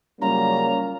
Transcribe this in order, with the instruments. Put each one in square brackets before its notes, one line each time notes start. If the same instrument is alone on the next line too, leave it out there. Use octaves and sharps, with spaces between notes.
[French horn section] C#3 F#3 G3 [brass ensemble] A#3 C#4 [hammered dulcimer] F4 [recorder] A#5